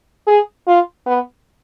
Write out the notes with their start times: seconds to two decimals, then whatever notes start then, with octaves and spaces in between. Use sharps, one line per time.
0.27 G#4
0.67 F4
1.06 B3